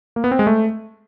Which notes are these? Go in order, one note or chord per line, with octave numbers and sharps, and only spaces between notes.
A#3
B3
C4
G#3
A3